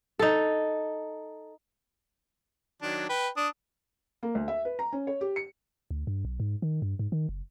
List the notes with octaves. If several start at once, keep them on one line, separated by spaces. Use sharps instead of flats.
D#4 A4
D#3 F#3 D4
B4 G5
D4 D#6
A#3
D2
E5
B4
A#5
C#4
C#5
G4
C#7
D2
G2
B1
G#2
D#3
G2
G#2
D#3
F#1